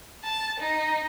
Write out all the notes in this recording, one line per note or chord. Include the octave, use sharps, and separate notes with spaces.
A5
D#4